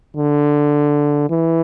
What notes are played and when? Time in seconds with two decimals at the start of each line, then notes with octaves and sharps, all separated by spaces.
0.16 D3
1.30 E3